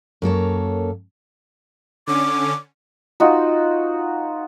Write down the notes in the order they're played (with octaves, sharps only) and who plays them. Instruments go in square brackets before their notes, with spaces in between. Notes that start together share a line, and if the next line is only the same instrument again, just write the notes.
[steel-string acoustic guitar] F#2 A#3 A4 C#5
[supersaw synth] D3 C#4 [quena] D6
[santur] D#4 F4 F#4 C5